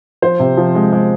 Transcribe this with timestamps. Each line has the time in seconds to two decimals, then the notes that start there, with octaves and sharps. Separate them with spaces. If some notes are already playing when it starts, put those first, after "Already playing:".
0.22 F3 C5
0.40 C3
0.57 F3
0.75 G#3
0.93 G#3